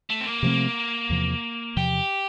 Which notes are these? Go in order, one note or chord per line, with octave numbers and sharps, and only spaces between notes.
A3
C4
A#3
C3 F3 A3 C4
E2 C3 F3
E2 C3 F3 G4